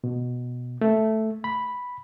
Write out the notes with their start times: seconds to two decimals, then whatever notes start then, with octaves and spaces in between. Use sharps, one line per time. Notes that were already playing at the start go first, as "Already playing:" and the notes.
0.04 B2
0.81 A3
1.44 B5